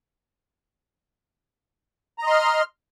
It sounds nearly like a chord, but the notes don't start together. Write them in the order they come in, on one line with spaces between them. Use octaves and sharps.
A#5 D#5 C6 F6